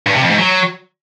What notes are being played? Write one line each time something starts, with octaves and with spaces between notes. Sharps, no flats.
G2
C3
F2
G#2
F#3